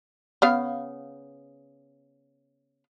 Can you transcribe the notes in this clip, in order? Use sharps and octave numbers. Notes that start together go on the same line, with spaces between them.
C#3 B3 F5